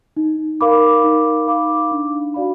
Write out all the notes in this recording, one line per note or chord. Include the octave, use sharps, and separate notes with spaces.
D#4
A#4 F5 B5 D6
D#4
A#4 F5 B5 D6
D4
F#4 D5 F5 B5